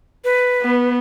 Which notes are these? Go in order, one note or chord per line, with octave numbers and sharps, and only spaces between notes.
B4
B3